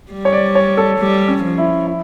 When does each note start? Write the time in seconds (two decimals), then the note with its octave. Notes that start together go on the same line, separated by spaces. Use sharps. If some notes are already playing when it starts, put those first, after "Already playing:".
0.12 G3
0.25 C#5
0.33 D5
0.55 C#5
0.77 A4
0.99 G3
1.28 C#4
1.43 F3
1.58 E4
1.87 E4